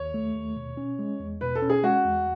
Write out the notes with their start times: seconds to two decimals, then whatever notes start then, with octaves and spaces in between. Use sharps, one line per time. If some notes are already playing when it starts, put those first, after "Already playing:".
Already playing: D#2 C#5
0.14 A3
0.35 D#2
0.56 B2
0.77 C#4
0.99 G#3
1.20 E2
1.41 B2 B4
1.55 A4
1.62 C#4
1.70 G#4
1.83 G#3 F#4
2.04 E2